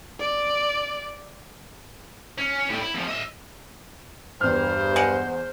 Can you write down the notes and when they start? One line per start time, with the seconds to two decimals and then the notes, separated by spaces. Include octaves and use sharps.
0.20 D5
2.38 C#4
2.69 A2 G3
2.81 E4
2.94 E2 F3
3.08 D#5 E5
4.41 E2 G2 C5 F6
4.96 G#3 F#5